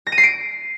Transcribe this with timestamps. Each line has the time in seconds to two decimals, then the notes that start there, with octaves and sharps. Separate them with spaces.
0.07 A#6
0.12 D#7
0.18 C7
0.23 D7